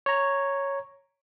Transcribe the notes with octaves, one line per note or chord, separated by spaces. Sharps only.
C#5 A#5